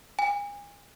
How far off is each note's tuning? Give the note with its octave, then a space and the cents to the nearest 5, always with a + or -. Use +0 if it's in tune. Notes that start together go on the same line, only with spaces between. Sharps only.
G#5 -35